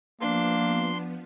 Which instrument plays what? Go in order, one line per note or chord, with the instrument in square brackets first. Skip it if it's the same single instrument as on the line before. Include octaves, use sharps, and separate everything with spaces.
[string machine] F3 B3 [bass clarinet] A#3 [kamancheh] D4 [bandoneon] C6